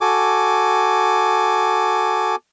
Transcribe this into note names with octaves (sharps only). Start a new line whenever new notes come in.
F#4 A4 G#5 D6